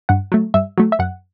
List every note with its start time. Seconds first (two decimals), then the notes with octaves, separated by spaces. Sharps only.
0.09 G2 F#5
0.32 F#3 A3
0.54 G2 E5
0.78 F#3 A3
0.92 E5
0.99 F#2 F#5